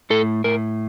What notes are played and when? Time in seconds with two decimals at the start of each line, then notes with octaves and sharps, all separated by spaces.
0.10 A2 A4
0.44 A2 A#4